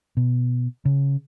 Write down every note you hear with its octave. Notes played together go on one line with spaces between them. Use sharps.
B2
C#3